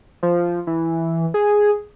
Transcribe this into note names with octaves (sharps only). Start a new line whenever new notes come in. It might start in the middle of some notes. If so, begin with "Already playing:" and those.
F3
E3
G#4